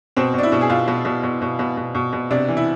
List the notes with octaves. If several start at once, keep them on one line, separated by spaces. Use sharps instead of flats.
B2 C4
B2 D4
E4
B2
G#4
B2 F4
B2
B2
B2
B2
B2
B2
B2
B2
C3 D4
E3
E4